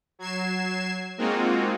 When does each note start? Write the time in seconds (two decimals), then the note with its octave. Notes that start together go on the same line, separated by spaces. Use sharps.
0.19 F#3 G#6 C7 E7
1.18 G#3 A#3 C4 D#4 F4 F#4